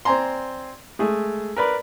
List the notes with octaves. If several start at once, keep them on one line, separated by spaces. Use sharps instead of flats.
C4 D5 G#5 A#5 C6
G#3 A3 G#4
A#4 B4 D5 B5